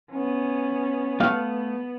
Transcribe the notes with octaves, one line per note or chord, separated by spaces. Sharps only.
B3 C#4
A3 B3 F5